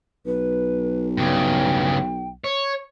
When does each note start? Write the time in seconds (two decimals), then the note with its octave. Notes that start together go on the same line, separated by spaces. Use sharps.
0.26 B1 B4
1.17 G2 C#3 G5
2.44 C#5